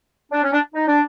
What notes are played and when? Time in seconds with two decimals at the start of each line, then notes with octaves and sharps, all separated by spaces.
0.32 D4
0.43 C#4
0.52 D4
0.74 D#4
0.87 D4